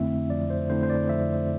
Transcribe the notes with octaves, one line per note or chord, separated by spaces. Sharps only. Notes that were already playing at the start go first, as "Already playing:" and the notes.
Already playing: F2 D3 A3 C4 E4 E5
F2 D5
C5
D3 A3 C4 E4 C5
C5
D5
F2 E5